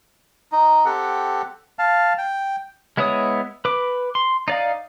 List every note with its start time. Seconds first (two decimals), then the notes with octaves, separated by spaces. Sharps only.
0.52 D#4
0.85 C4 G4 A4 F#5
1.79 F5 A5
2.18 G5
2.97 G#3 B3 E4 C#5 D#6
3.65 B4 D6
4.15 C6
4.48 D#4 D5 F5